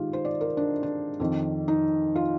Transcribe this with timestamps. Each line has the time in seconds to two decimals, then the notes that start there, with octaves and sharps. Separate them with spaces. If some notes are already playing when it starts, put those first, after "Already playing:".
Already playing: G#2 D#3 D#4 F4 G4
0.13 C5
0.25 D5
0.41 A#4
0.57 D4
0.83 D4
1.20 F2 D#3
1.68 D#4
2.16 F4